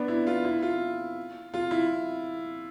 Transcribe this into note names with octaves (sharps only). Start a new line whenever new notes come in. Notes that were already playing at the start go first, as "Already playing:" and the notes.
Already playing: B3 D4
E4
F4
E4
F4
F4
E4